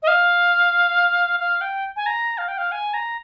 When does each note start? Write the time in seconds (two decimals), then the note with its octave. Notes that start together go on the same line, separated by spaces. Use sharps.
0.03 D#5
0.07 F5
1.40 F5
1.61 G5
1.96 G#5
2.06 A#5
2.38 F5
2.48 G5
2.58 F5
2.72 G#5
2.94 A#5